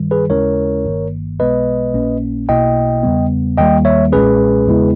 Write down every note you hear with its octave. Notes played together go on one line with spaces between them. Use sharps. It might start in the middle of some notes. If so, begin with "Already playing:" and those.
Already playing: G2 D#3 G3
G#4 B4
D#2 C#3 G#3 C#4 E4 A#4 C#5
G1 G2 D#3 A#3
B1 B2 G#3 B3 B4 D#5
A#1 A#2 A#3 C#4
B1 B2 A#3 E4 D#5 G5
E2 C#3 G3 B3
D#2 D#3 G3 A#3 D#5 G5
C#5 E5
B1 A#2 G#3 C#4 G#4 B4
E2 C#3 G#3 B3 E4